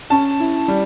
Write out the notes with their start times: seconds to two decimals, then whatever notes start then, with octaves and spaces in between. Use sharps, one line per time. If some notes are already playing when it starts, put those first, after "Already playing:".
0.10 C#4 A5
0.40 E4
0.68 G3